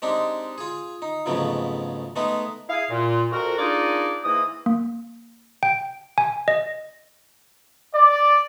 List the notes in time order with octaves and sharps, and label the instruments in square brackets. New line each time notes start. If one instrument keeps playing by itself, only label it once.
[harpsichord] G#3 C4 D4 D#4 G4
F4 G#4
D#4
F2 G#2 C#3 F#3 A3 B3
G#3 A3 B3 D#4 B4
[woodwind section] E4 G#4 F5
A#2
F2 F#4 A#4
A#3 D4 D#4 F4 G#4 D5
G#2 E3 A#3 D#6
[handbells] A#3
G5
G#5
D#5
[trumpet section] D5